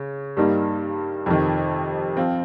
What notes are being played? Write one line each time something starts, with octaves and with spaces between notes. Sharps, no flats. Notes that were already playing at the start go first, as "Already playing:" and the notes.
Already playing: C#3
G2 G3 A#3 D#4
F2 C3 D#3
F3 C4 F4